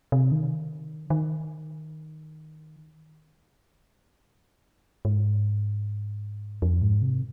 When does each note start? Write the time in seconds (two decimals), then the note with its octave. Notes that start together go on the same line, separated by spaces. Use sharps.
0.12 C3
0.32 D#3
1.10 D#3
5.05 G#2
6.62 F2
6.82 G#2
7.02 C3